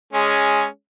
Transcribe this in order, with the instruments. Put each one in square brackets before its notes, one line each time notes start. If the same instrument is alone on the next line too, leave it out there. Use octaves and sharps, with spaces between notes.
[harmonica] G#3 C#4